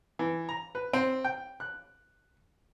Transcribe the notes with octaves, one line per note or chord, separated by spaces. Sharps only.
E3
A#5
B4
C4
G5
F#6